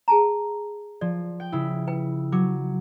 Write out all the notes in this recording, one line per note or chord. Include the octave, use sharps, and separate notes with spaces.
G#4 A5 A#5
F3 D5
G5
C#3 E4
B4 G5
F#3 D6